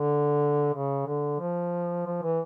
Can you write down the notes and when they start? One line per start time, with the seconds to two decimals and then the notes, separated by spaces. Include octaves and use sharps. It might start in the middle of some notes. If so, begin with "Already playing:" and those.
Already playing: D3
0.74 C#3
1.07 D3
1.40 F3
2.06 F3
2.23 E3